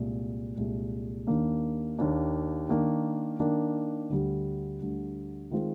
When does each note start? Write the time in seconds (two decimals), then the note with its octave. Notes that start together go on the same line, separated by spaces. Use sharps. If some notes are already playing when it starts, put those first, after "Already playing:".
Already playing: C2 A#2 G#3
0.57 C2 A#2 G#3
1.27 D#2 D#3 A#3 D4
1.99 D#2 D#3 A#3 D4
2.69 D#3 A#3 D4
3.40 D#3 A#3 D4
4.10 D2 D3 G3
4.81 D2 D3 G3
5.51 D#3 G#3 C4 F4